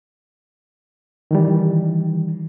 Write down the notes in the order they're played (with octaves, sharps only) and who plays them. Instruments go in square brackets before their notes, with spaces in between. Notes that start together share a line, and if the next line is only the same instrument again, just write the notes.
[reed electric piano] D#3 E3 G3